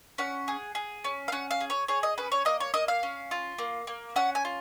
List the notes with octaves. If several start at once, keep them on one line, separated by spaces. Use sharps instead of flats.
C#4 F#5
G#4
G#4
C#4
F5
C#4 F#5
F5
G#4
C#5
G#4 C#5
D#5
C#4 B4
C#5
A#3 D#5
C#5
A#3 D#5
F5
C#4
F4
A#3
A#3
C#4 F#5
G#5
F4